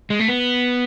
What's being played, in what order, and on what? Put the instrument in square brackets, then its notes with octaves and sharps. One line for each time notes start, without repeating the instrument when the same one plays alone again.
[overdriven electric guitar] G#3
A3
B3